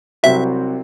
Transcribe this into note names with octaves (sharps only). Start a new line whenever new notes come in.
C2 C3 F#3 C4 F#4 E5